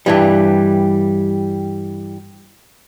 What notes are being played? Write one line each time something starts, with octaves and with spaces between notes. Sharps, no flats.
G2 E3 G3